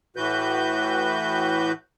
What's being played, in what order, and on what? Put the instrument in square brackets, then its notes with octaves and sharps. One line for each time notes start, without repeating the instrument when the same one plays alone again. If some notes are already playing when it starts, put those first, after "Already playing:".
[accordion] A2 E3 F#4 B4 G6